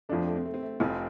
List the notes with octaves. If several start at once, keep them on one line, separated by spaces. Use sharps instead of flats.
F2 F3 A3 D4
C4
A3
C4
A3
C4
A3
F1 F2 F3 C4